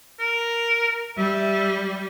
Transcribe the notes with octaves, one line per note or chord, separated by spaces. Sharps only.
A#4
G3 E5